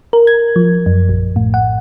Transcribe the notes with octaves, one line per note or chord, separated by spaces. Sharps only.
A#4
G#6
F3
F#2
A#1
A2
F#5